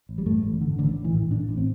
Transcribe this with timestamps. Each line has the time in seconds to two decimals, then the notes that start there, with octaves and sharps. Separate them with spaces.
0.09 A1
0.18 G3
0.26 G2 A3
0.43 A1
0.61 D3
0.78 A1 D3
0.96 A1
1.05 E3
1.14 A2
1.31 A2 D4
1.49 A1
1.57 C4